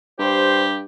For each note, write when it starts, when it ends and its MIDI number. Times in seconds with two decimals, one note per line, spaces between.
0.19 0.86 43
0.19 0.81 67
0.19 0.61 72